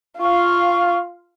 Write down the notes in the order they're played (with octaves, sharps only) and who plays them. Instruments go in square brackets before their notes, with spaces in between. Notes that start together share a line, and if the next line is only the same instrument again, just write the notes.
[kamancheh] F4 F5 [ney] C#6